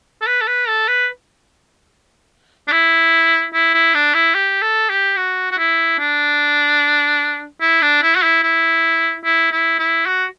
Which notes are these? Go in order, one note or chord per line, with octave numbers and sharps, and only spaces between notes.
A4
B4
A4
B4
A4
B4
D4
E4
E4
E4
D4
E4
G4
A4
G4
F#4
F#4
E4
D4
E4
D4
E4
F#4
E4
E4
E4
E4
E4
F#4